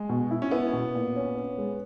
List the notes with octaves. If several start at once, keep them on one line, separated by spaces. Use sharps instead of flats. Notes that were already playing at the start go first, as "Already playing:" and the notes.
Already playing: G#3
B2
E4
C#4
B3 E4
B2
A#2
C#4
C#4
G#3